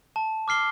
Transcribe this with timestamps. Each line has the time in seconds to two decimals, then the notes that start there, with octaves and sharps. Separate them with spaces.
0.16 A5
0.48 D6 F6 C7 G7